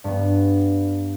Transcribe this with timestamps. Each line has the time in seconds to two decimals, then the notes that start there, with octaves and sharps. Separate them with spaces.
0.04 G2 B3